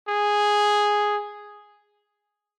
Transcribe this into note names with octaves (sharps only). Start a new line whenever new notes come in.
G#4